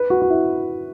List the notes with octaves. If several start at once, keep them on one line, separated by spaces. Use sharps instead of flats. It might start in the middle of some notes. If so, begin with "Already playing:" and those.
Already playing: B4
F#4
F#4
E4